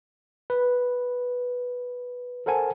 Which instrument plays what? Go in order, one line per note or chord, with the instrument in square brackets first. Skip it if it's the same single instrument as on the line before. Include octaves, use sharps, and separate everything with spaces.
[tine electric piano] B4
A4 A#4 C5 F#5 G#5 A5